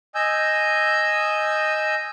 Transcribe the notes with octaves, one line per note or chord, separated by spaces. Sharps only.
D#5 G#5 E6 G6